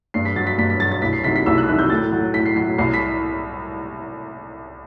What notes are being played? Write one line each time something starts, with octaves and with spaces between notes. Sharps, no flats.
G2 C7
B6
F#3 A6
B6
G2 B6
B6
F#3 A6
A6
C2 B6
C7
C3 D#3 F#3 B6
B6
C2 E6
F#6
C3 D#3 F#3 F#6
G6
A2 A6
F#3
A2 B6
C7
F#3 C7
C2 C7
B6